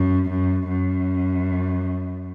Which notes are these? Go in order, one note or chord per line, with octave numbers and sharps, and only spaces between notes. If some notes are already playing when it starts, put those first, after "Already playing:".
Already playing: F#2
F#2
F#2